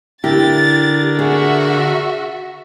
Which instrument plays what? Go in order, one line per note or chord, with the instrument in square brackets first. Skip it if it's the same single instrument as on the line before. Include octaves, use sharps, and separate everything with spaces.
[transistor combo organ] D3 A#4 [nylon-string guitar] E4 G4 [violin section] A6
[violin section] F#4 E5 [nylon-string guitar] G#4